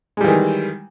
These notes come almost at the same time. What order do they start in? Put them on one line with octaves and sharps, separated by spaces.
G#3 G3 E3 D#3